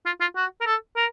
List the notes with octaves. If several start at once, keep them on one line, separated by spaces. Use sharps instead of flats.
F4
F4
F#4
A#4
A4
A#4